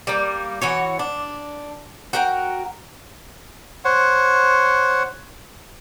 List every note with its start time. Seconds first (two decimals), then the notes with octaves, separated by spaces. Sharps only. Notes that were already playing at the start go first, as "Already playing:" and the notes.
0.07 G3 A#3
0.61 E3 F#4 C#5
0.99 D4
2.13 F#4 A#4 G5
3.85 C5 C#5 F#5